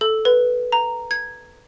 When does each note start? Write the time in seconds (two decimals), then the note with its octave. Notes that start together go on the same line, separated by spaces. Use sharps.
0.01 A4
0.25 B4
0.72 A#5
1.11 G#6